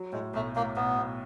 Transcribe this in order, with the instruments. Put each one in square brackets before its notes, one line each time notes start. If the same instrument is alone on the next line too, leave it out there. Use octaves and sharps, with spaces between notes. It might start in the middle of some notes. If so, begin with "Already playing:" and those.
Already playing: [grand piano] F#3
[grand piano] A2 [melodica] G#3
[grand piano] B1 [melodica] A3
[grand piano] A2 [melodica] A#3
[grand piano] B1 [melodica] B3
[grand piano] B1